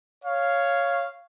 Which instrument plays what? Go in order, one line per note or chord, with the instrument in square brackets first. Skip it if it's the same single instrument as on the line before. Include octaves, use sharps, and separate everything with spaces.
[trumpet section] C#5 F5